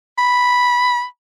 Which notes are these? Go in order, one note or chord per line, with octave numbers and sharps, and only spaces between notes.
B5